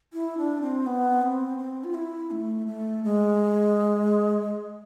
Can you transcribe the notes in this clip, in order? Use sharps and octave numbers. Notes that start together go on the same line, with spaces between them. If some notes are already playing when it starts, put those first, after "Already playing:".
E4
D4
C4
B3
C4
C4
F4
E4
A3
A3
G#3